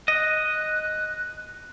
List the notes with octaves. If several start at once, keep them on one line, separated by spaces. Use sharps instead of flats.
D#5 F#6